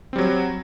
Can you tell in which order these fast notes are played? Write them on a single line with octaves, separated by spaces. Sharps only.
C4 G3 F#3